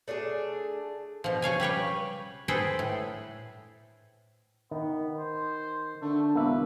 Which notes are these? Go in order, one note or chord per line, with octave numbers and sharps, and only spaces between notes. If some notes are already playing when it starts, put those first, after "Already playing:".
A3 D4 G4 G#4
B2 F3
C#3 C#5 F5 G#5
G3 B4 C#5 G5
G#4 A4 B4 C5 G5
A2
D#3 B3
C5
D3 A3
E1 A#3 B4 E5